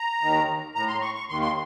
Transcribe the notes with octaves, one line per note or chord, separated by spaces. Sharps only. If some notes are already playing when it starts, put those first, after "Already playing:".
Already playing: A#5
D#2 D#3
A2 A#5
C6
C#6
C#6
D#2 D#3 C6
C6